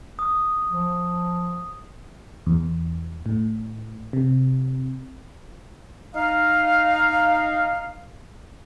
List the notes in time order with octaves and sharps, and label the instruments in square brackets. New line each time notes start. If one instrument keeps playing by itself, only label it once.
[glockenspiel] D#6
[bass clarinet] F3
[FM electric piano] E2
A2
C3
[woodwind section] D#4 F5